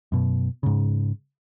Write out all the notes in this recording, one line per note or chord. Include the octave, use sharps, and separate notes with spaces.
F#2 B2
G#2 C#3